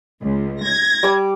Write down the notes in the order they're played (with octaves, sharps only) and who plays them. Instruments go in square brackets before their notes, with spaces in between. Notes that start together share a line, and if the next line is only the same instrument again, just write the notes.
[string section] C#2
G#6 A#6
[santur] G3 D6